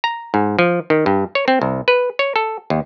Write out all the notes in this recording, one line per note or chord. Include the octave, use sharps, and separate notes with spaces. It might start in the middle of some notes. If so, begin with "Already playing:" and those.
A#5
G#2
F3
D#3
G2
C#5
C4
C2
B4
C#5
A4
D#2